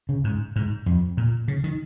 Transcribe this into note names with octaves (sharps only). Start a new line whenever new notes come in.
C#3
G#2
G#2
F2
A#2
C#3
D#3